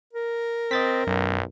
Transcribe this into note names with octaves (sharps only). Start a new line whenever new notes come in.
A#4
C4 D#5 A6 B6
B1 F#2